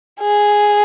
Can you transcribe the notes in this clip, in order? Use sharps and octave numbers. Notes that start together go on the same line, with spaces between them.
G#4